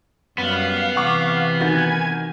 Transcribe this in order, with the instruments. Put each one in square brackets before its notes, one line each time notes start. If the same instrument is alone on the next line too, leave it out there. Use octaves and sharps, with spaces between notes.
[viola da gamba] F#2 G3 [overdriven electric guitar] B3 [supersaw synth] F5
[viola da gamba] C3 E3 [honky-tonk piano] F#5 C#6 D6
[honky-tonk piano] D#3 F#4 A6 [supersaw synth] G#5 G#6